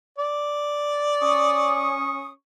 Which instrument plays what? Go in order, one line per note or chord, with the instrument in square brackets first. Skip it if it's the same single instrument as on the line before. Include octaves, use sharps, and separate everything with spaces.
[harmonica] D5
[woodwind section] C#4 C#6 D#6